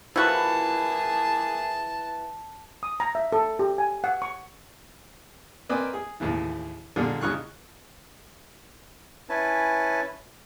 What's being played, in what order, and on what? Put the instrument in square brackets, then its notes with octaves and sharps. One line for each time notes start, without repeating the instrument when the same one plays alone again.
[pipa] F3 F#4 [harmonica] A#3 G#4 [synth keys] E4 B4 [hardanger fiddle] A5
[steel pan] D#6
A#5
E5
A4
G4
G#5
F#5
C#6
[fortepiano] A#3 C4 B4 D5 D#5 G#5
G#4
D#2 A2 C#3 E3
A#2 D3 G3 G#3
C2 C#3 D#4 C#6 F6 F#6
[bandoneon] C#4 E4 B4 G#5 A5